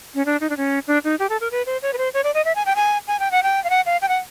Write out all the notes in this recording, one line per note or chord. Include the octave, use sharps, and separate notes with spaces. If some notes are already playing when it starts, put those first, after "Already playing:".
C#4
D4
D#4
D4
C#4
D4
D#4
G4
A4
A#4
B4
C5
C#5
B4
C5
C#5
D5
D#5
E5
G#5
G5
G#5
G#5
G5
F#5
G5
F5
F#5
F5
G5
F#5